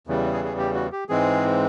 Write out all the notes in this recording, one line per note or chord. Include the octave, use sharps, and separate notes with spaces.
E2 C#3 E3 G3
G#4
G#4
G4
F#4
G4
G#2 E3 G#3 C4 G#4